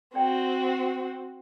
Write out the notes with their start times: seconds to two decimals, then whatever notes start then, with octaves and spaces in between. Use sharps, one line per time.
0.15 C4 F#4 D5 G5